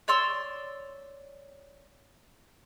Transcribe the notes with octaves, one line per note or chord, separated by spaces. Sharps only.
C#5 D5 C6 E6